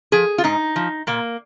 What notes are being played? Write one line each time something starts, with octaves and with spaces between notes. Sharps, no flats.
F3 G#4
F4
G#2 D#4
F3
A#2 A#3